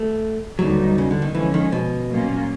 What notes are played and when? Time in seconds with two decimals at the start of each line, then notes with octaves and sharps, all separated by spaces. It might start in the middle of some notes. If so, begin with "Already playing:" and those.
Already playing: A3
0.59 D#2 D3 F#3 G3 B3 D#4
0.98 C#3
1.11 D3
1.22 D#3
1.35 D3 E3 F3 G#3 C#4
1.54 D#3
1.72 B2
2.10 A#2 F#3 A#3 C#4 F4